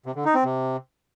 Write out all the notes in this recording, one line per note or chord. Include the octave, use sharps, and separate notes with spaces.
C3
D3
D#4
C4
C3